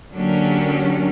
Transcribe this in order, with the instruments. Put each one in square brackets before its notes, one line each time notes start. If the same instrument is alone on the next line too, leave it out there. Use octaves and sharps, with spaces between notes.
[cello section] D3 F#3 A#3 C#4 D4 G4